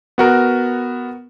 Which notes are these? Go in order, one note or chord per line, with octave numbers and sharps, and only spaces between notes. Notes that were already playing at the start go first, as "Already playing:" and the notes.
B3 F#4 A#4